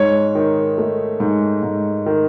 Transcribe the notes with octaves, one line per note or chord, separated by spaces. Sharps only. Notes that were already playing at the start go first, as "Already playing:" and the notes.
Already playing: G#2 C#5
D#3
A3
G#2
G#2
D#3